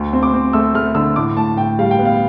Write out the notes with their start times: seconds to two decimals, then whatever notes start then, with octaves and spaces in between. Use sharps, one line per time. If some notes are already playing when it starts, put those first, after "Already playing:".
Already playing: D2
0.13 C4
0.23 D6
0.34 C4
0.53 A3 E6
0.74 A3 F6
0.95 D3 E6
1.16 A2 D6
1.37 A2 A5
1.58 A2 G5
1.79 G3 F5
1.91 G5
1.99 B3
2.05 F5